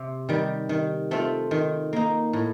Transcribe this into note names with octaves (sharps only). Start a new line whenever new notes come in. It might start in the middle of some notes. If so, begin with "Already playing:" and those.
Already playing: C3
D#3 G3
D#3
A3 C4 F4
D#3
A#3 D#4
A2